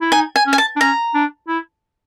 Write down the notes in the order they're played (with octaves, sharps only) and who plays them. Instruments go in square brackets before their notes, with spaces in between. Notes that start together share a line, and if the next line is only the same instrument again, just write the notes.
[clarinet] E4
[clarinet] D#4 [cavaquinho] G#5
[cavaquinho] G#5
[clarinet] C#4
[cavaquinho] G#5
A5
[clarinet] D4
[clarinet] C#4 [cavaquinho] A#5
[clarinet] D4
E4